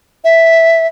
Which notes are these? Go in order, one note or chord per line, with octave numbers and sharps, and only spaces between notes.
E5